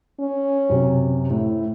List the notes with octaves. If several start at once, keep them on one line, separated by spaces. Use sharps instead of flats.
C#4
F#2 C3
A2 E4